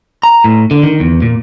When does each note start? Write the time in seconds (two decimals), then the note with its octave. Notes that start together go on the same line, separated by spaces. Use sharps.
0.23 A#5
0.44 A2
0.71 D3
0.83 D#3
1.00 E2
1.22 A#2